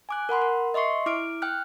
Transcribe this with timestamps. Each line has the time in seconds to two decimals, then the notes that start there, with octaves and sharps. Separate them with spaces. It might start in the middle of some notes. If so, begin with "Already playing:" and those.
0.09 G#5 D6 F#6
0.29 A#4 F#5 B5 C6
0.42 A#4
0.74 D#5 E5 C6 C#6 C7
1.06 E4 D6 F6 D7
1.42 G5 F6 F#6